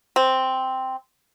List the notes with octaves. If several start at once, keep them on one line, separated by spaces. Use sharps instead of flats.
C4